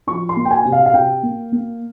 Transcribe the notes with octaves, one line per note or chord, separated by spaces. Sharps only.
F3 C#6
C6
A#3
G5
G#5
C3
F5
F5
C3 G5
A#3
A#3